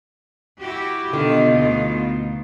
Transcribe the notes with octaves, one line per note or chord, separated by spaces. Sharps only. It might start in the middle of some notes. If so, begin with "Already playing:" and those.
E4 F#4 G4
B2 D3 D#3 F4
D2